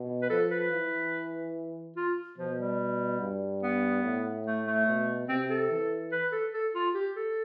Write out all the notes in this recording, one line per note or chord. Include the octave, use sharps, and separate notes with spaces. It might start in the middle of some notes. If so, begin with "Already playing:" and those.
Already playing: B2
B4
F3 A4
B4
E3
F4
B2 F3
G3
G2
B3
A2
A3
A3
B2
C3 C4
A4
E3
B4
A4
A4
F4
G4
A4